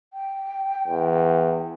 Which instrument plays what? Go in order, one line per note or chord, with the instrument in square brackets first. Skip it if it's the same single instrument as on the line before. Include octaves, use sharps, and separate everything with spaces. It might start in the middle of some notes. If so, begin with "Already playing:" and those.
[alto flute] G5
[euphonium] E2